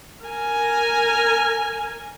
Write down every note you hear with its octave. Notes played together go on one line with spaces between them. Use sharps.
A#4 G#5